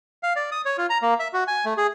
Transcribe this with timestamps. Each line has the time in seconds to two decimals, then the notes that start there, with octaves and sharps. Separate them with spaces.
0.23 F5
0.36 D5
0.52 D#6
0.65 C#5
0.78 F4
0.90 A#5
1.02 A#3
1.19 E5
1.33 F#4
1.47 G#5
1.65 A3
1.77 G#4